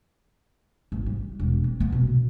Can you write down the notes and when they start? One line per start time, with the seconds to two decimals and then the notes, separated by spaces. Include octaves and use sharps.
0.92 G#1
1.06 G3
1.40 E1
1.64 C4
1.80 B3
1.92 B2
2.07 B2